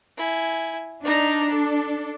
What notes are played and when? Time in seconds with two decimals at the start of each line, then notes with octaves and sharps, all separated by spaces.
0.17 E4 G#5
1.05 D4 D#4 A#5
1.49 A4